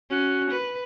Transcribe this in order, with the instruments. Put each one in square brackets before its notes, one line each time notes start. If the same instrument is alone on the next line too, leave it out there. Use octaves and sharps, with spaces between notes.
[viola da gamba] C#4 [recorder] F#4
[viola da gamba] B4